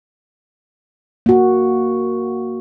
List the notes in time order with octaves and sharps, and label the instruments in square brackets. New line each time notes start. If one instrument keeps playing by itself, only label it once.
[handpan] A#3 F#4